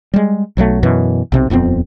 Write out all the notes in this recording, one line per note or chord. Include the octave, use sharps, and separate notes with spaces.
G3 G#3
B1 F#3 G3 A3
F#2 B2 E3
B1 C3 C4
D#1 F2 B3 C4